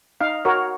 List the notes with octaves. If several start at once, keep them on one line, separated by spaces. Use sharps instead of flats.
D#4 F5
F#4 A#4 C#5